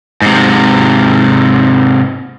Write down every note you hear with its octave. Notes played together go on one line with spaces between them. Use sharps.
G#2 C3